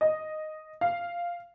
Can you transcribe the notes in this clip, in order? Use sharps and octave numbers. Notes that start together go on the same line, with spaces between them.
D#5
F5